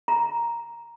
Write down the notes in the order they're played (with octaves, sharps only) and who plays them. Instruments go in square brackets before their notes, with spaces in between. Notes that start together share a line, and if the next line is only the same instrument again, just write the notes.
[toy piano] A#5